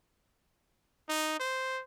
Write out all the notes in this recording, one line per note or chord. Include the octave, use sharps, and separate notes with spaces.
D#4
C5